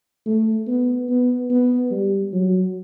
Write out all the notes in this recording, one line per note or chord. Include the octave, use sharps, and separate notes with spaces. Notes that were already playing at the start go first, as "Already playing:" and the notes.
A3
B3
B3
B3
G3
F#3